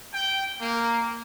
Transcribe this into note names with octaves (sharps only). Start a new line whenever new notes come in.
G5
A#3